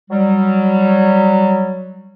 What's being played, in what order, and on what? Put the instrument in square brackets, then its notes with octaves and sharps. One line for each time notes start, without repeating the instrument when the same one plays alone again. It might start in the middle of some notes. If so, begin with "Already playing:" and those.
[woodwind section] F#3 G3